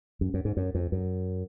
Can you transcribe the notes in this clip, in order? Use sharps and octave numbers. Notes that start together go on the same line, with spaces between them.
F#2
F#2
G#2
F#2
F2
F#2